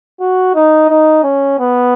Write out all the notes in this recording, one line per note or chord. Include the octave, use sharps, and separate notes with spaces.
F#4
D#4
D#4
C#4
B3